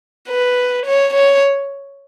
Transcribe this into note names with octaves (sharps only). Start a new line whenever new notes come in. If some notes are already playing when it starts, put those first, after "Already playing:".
B4
C#5
C#5